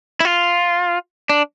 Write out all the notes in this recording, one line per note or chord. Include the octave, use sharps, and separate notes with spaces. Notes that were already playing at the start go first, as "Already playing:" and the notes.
E4
F4
D4